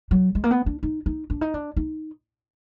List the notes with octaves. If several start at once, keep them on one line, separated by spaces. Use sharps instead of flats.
F#3
G#3
A#3
B3
D4
D#4
D#4
D4
D#4
D4
D#4